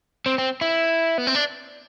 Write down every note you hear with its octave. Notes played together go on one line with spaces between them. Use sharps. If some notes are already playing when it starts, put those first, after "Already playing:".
C4
C4
E4
B3
C4
D4